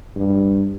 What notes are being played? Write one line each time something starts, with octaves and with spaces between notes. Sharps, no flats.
G2